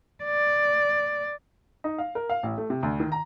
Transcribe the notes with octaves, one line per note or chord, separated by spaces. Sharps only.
D5
D#4
F5
A#4
F5
A1
A3
C3
D2
D#3
A#5